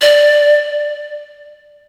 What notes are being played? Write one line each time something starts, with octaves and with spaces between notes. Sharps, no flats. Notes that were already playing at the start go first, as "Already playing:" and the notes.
D5